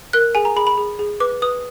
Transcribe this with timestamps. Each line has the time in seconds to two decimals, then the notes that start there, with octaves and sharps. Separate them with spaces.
0.13 A#4 F#6
0.35 G#4 G#5
0.45 A#5
0.56 G#4 B5
0.67 B5
0.78 G#4
0.99 G#4
1.20 B4 D6
1.42 B4 D#6